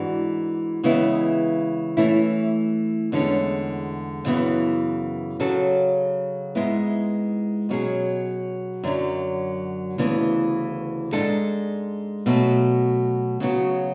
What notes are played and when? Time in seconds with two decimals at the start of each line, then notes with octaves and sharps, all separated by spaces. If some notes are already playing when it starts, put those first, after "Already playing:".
Already playing: G#2 E3 D4 F#4
0.83 C#3 E3 G#3 B3 E4
1.97 E3 A3 C#4 E4
3.12 E2 D3 G#3 C#4
4.26 F#2 C#3 E3 B3
5.40 C#3 F#3 C#4 F#4 A4
6.55 G#2 G#3 B3 E4
7.69 B2 F#3 C#4 G#4
8.83 F#2 D3 F#3
9.98 D2 C#3 E3 B3
11.12 G#2 G#3 D4 A4
12.26 B2 F#3 A3
13.40 C#3 F#3 B3 F#4